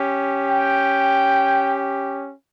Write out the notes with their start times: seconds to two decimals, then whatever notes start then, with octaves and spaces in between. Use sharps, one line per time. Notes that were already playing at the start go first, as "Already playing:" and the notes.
Already playing: C#4 G4
0.51 G5